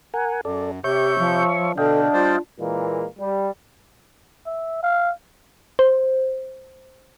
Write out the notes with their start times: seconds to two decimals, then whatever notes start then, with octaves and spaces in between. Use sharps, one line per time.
0.14 A#4 F#5 G#5
0.45 F#2 A4 D5
0.84 C3 G4 C#5 E5 C#6 G6
1.19 F3
1.78 B2 D3 D4 A4 D#5 F5 G5
2.14 G3 F4 C5 D5
2.59 A#2 E3 G#3 A#3
3.19 G3
4.46 E5
4.83 F5
5.79 C5